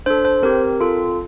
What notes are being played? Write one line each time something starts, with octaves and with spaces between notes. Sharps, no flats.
D4 A4 C5
C5
C4 G4 A#4
C4 F4 A4